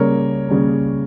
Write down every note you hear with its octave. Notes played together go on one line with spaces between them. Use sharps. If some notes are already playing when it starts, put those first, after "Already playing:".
Already playing: C#3 G3 A#3 A#4 C#5
C#3 G3 A#3